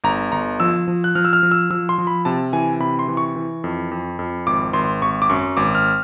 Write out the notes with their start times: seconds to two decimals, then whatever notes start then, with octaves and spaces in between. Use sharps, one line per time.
0.04 G1 A#5
0.32 G1 A#5
0.60 F3 E6
0.88 F3
1.04 F#6
1.15 F3 F6
1.25 E6
1.33 F6
1.43 F3
1.52 E6
1.70 F3 E6
1.89 C6
1.98 F3
2.07 B5
2.25 C3 A5
2.53 E3 G#5
2.80 C3 B5
2.99 C6
3.08 E3
3.17 C#6
3.36 E3
3.64 F2
3.91 F2
4.19 F2
4.47 G#1 D6
4.73 G#1 C6
5.02 G#1 C#6
5.22 D6
5.29 F#2 C#6
5.57 G#1 D6
5.75 F6